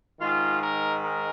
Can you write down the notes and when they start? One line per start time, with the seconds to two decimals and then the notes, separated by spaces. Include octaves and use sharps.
0.21 G#2 D#3 G#3 F4
0.61 A#4
1.02 A#4